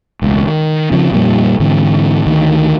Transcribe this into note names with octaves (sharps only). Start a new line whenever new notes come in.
E1 C#2
D#3
C#3 F3 C4
F2 A#2 G3
G#2 D3 E3 C4
D2 D#3